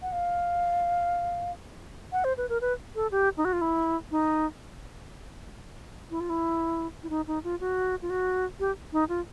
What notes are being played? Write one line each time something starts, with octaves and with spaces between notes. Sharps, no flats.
F#5
F5
F#5
C5
B4
A#4
B4
A4
G4
D#4
F#4
F4
E4
D#4
E4
F4
E4
E4
D#4
D#4
F4
F#4
F4
F#4
G4
D#4
F4